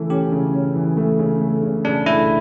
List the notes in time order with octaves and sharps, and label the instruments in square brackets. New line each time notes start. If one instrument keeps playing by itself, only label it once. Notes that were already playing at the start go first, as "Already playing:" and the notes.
Already playing: [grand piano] C#3 E3 A3 [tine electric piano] A4
[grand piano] C#4 [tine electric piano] G4
[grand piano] C#3
C#4
E3
A3
C#3
A3
C#3
[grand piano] C#3 [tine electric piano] D4
[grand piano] A3 [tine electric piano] E4